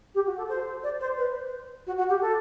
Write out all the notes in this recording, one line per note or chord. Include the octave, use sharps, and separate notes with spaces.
G4
F#4
A4
C5
D5
C5
B4
F#4
F#4
G4
A4